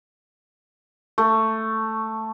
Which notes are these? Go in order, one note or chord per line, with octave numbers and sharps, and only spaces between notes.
A3